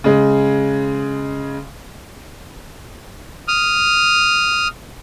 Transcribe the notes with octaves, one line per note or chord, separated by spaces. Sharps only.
C#3 G#3
D#6 F6